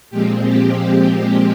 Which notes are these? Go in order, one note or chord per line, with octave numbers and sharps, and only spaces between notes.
A#2 F3 G#3 C4 G4
G4
G4